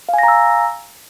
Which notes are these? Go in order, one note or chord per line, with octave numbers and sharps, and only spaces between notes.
F5 G#5 A#5 E6 A#6